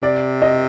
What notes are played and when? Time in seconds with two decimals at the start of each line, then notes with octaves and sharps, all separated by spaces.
0.02 C3 D5
0.42 D#5